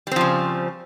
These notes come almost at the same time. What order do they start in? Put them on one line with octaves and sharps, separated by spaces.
G3 C4 F3 C#3